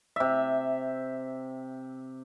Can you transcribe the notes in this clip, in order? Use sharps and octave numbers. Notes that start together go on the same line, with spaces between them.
C3 E5